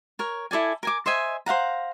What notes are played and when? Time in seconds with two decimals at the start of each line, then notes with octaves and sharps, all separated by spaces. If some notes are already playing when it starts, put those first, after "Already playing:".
0.19 A#4 C#5
0.51 E4 A4 D5 G#5
0.83 A#4 G#5 D6
1.06 C5 D#5 E5 G#5
1.46 C5 F5 F#5 A#5